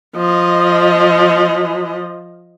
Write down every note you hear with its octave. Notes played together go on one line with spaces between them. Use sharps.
F3 D#5